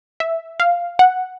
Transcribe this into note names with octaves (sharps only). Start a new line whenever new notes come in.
E5
F5
F#5